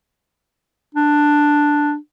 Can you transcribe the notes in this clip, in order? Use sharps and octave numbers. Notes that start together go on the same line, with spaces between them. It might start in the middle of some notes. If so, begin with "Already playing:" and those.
D4